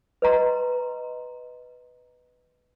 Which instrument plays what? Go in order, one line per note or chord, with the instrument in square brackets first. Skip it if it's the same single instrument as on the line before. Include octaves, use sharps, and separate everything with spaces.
[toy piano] B4 D#5 A#5 C6